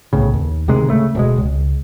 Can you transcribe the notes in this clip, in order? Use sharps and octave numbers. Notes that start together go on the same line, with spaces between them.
B1 A2 C#3
D#2
D1 C3 D#3 G#3
C#3 A3
D1 B2 G#3
C#2